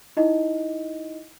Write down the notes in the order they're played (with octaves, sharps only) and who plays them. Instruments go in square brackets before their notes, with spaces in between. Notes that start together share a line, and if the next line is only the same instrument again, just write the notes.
[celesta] D#4 E4 D#5